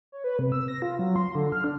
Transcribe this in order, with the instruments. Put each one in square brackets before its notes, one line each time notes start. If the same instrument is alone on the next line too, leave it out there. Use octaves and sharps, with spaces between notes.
[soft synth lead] C#5
B4
C3
E6
A#6
F4
F#3
C6
D3
F6
D4